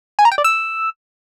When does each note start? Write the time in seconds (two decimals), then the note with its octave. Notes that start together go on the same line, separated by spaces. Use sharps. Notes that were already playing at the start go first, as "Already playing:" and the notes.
0.19 G#5
0.25 A#5
0.32 G5
0.38 D5
0.44 E6